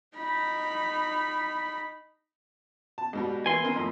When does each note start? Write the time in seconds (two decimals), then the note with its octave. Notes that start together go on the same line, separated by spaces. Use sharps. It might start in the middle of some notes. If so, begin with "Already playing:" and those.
0.17 D#4 B5
2.98 A5
3.13 G#2 B2 G3
3.46 E3 A#3 G#5 C6
3.64 D#3 C4 A#4
3.76 F2 A2